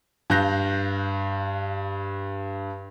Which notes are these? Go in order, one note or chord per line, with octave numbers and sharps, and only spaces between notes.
G2 F5 F#6 G6 A#6 F7